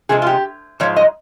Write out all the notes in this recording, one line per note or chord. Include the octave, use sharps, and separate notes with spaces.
C3 F3 G#3 G#4
F4
G4
G#2 F3 G#3 C#5
D#5